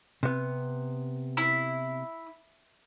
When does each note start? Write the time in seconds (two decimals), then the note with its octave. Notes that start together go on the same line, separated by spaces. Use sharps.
0.23 C3 B3
1.37 E4